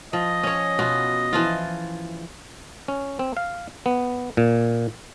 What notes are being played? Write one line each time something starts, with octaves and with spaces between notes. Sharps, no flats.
F3 D#5
C#4 C#5
B2 F4 F#4
E3 F3 F4
C#4
C4
F5
B3
A#2